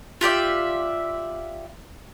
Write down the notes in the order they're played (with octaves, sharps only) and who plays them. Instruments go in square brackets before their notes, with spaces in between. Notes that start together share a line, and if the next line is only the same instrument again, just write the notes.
[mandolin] F4 G4 D5 E5